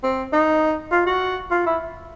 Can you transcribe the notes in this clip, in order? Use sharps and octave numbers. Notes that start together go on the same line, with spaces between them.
C4
D#4
F4
F#4
F4
E4